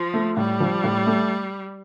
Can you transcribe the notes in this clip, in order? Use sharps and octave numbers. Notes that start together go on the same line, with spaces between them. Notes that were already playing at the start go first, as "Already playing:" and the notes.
Already playing: F3
A3
A2 G3
F3
A2
A3